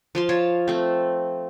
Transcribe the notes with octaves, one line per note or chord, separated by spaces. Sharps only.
F3 F5 C6
F4 C#5 A5
A3 C4